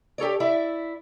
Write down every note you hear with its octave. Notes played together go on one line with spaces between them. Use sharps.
G4 A4 C#5 D5
E4 D5 E5